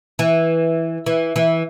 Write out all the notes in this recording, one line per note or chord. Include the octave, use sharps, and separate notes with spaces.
E3
E3
E3